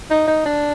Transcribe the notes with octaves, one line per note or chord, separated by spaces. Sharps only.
D#4
D#4
D4